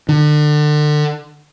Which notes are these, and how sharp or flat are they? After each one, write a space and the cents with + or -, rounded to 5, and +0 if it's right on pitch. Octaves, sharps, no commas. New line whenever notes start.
D3 +35